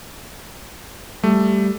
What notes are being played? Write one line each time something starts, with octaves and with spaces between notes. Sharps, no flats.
G3 A3